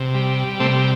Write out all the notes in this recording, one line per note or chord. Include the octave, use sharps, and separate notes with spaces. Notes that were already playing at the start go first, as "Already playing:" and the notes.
Already playing: C3
G3
C3 A3 C4